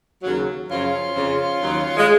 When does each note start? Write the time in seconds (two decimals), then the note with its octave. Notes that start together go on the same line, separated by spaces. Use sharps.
0.22 D#2 C#3 F#3
0.68 F#2 C#3 F3 C#4 F4
1.15 F2 C#3 F3
1.61 D#2 D#3 F#3
1.97 G#3